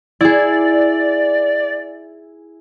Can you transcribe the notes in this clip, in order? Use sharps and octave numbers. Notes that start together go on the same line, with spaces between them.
E4 G#4 D5